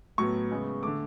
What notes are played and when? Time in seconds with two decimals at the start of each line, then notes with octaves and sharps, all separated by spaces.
0.18 A2 F#3 B3 C#6
0.51 C#3 G#3 B3
0.82 D3 A3 D6